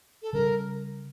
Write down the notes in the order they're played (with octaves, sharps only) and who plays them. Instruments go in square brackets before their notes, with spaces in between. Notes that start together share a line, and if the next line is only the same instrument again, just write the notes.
[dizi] A4
[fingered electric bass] C#3 G3 C#4 [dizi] A#4